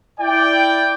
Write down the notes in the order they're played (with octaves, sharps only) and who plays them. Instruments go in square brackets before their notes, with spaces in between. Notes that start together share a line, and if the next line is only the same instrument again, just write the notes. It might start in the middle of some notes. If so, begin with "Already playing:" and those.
[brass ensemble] E4 D5 G5